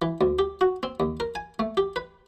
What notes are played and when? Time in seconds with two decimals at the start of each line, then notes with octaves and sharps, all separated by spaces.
0.02 E3
0.21 D2
0.39 G4
0.61 F#4
0.83 C4
1.00 D#2
1.20 A#4
1.35 G#5
1.59 A3
1.77 G4
1.96 B4